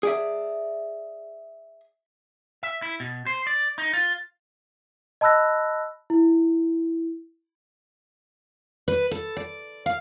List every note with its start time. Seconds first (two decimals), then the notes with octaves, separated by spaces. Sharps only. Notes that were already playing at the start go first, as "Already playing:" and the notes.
0.03 G#4 D5 E5
2.63 E5
2.82 E4
3.00 B2
3.26 C5
3.47 D5
3.78 D#4
3.93 F4
5.21 D#5 A5 B5 E6 F#6 A#6
6.10 E4
8.88 B4
9.11 A4
9.37 D5
9.86 F5